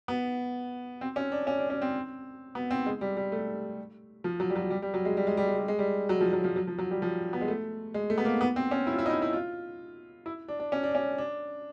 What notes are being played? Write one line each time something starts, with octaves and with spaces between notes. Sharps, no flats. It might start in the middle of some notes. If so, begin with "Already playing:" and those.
B3
C4
C#4
D4
C#4
D4
C#4
C4
B3
C4
G#3
G3
G3
A3
F3
F#3
G3
F#3
G3
G3
F#3
G#3
G3
G#3
G3
G#3
G3
G#3
G3
F#3
F3
F#3
F3
F#3
F3
F#3
G3
F3
B3
G#3
A3
G#3
A3
B3
A#3
B3
C4
C#4
E4
F4
E4
D#4
E4
E4
F4
E4
D4
D4
C#4
D4
C#4
D4